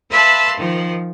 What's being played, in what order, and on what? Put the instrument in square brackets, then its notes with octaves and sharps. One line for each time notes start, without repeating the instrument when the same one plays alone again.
[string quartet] B4 E5 F5 A5 B5 C6
D#3 F3